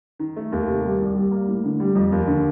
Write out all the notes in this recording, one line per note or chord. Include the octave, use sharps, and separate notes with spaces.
D#3
A3
D#2
C3
G3
C2
G3
A#3
A2
D3
G3
F2
D#2
D3